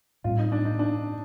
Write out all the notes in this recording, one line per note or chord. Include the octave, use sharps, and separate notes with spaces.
A2 G3 C4 F4
D#4
D4
D#4
D4